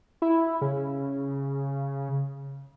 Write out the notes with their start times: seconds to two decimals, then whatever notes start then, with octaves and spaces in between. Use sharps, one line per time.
0.22 E4
0.61 C#3